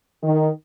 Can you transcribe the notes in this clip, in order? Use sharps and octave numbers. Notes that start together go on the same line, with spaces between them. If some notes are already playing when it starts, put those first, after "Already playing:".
D#3